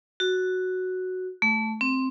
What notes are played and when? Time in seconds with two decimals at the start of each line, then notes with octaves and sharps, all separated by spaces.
0.20 F#4
1.42 A3
1.81 C4